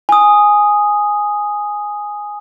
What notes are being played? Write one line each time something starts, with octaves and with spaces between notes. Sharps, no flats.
G#5 D#6